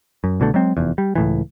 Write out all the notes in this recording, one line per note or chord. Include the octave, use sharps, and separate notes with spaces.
F#2
C2 B2 D3 A3
F#3 G#3 C4
F1 E2
G3
C#2 A2 E3